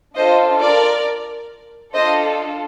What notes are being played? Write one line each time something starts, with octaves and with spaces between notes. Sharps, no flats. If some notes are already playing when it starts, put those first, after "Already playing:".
D4 F4 A4 C5 D#5
A#4 D5
D4 F4 A4 C5 D#5